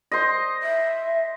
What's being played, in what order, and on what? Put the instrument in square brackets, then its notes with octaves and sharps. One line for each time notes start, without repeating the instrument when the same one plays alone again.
[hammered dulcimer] C5 D#5
[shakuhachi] E5